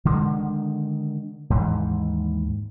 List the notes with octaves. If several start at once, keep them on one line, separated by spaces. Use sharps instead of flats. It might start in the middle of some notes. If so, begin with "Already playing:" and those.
D3 D#3 G#3
D#2 G#2 E3